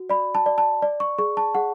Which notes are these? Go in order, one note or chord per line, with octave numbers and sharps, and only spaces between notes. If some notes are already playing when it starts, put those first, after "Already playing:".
Already playing: F#4
D5 B5
A5
D5
A5
D5
C#6
G#4 C#6
A5
G#4 F#5